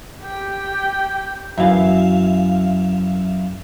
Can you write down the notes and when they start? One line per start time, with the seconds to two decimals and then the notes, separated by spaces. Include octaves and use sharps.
0.22 G4 G5
1.58 F#2 E3 E5 F5